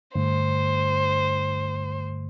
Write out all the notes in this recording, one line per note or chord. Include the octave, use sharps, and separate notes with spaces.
G2 D3 A3 C5